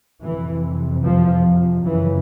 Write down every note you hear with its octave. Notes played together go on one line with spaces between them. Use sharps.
F2 C3 E3
F3
F#2 C#3 E3